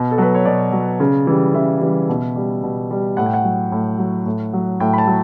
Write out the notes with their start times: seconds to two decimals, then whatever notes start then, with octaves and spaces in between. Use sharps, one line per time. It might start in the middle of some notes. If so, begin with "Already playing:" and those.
Already playing: B2
0.11 A4
0.18 F#3 B4
0.35 C#5
0.45 B2 D5
0.72 F#3
1.00 C#3
1.27 E3 G3
1.54 C#3 E5
1.82 E3 G3
2.09 B2
2.36 G3
2.63 B2
2.91 G3
3.17 A2 F#5
3.26 G5
3.34 F#5
3.44 F#3
3.72 A2
3.99 F#3
4.26 A2
4.53 F#3
4.80 A2 G5
4.93 B5
4.98 A5
5.07 F#3